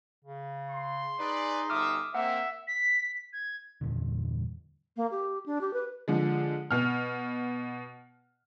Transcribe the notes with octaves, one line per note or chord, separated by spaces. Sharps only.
C#3
C6
D#4 G#4 B4 D5
G1 A4 E5 D6 D#6 F6
A#3 C4 E5 F#5
B6
G#6
E2 G2 A#2 D3
A#3
G4
D4
G4
B4
D3 F3 G#3
B2 F6